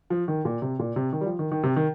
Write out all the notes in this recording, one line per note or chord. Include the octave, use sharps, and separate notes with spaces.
F3
D#3
A#2
C3
A#2
C3
D#3
G3
F3
D#3
D#3
C3
D#3